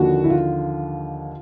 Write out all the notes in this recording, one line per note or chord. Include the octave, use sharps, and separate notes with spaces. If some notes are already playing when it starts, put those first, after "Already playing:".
Already playing: D#2 D3 F3 A#3 F#4
E4
F4